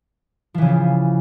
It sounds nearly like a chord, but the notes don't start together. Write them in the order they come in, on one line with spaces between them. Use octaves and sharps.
F3 E3 C#3